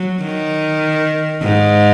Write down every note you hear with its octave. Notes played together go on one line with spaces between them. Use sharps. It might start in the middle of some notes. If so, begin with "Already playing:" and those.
Already playing: F#3
D#3
G#2